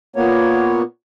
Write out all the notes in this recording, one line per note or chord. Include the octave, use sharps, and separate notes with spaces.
A#2 A#3 B3 C#5